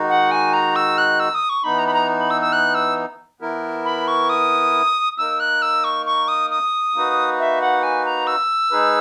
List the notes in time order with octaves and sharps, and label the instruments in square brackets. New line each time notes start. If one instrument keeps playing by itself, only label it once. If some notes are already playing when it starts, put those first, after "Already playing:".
Already playing: [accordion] D#3 G#3 D#4 F#4
[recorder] F#5
G#5
A#5
E6
F#6
E6
D#6
C#6
[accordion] E3 B3 D#4 [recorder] B5
[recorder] A#5
B5
A#5
B5
E6
E6
F#6
E6
[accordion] E3 B3 E4 A#4
[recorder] B5
C#6
D#6
[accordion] A#3 D#4 A#4 [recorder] E6
[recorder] F#6
E6
C#6
C#6
D#6
D#6
[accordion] A#3 D#4 F#4 B4
[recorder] E5
F#5
G#5
A#5
E6
[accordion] G#3 D#4 G#4 B4